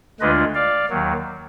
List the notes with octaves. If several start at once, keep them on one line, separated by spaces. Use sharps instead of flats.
D2 D3 G#3 D4 F4 B4 D#5
D5 F5
D#2 D#3 F#3